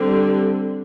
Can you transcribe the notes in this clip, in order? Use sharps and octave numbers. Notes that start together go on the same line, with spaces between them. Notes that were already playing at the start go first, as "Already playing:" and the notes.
Already playing: D3 G3 C4